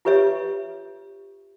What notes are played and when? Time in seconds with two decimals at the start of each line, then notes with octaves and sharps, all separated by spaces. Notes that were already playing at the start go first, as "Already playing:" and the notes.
0.05 F4 G4 B4 C#5 E5